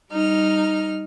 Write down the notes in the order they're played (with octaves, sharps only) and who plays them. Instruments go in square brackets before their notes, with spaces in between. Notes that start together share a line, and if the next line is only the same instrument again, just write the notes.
[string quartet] G3 D#4 F6